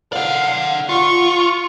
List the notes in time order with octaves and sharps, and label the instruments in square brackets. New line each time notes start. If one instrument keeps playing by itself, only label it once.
[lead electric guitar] D5 F#5 [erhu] F5
[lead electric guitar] F4 [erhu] C#6